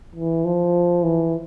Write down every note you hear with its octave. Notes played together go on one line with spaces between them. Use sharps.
E3
F3
E3